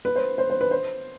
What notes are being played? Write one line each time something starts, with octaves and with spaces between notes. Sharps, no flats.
B4
C5
C5
C5
B4
C5